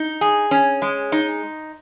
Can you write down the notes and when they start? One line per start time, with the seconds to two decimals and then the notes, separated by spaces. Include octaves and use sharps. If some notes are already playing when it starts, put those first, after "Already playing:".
Already playing: D#4
0.21 G#4
0.51 C#4
0.82 G#3
1.12 D#4